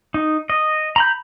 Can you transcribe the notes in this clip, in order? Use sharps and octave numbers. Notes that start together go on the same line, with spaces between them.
D#4
D#5
A#5 B5 G6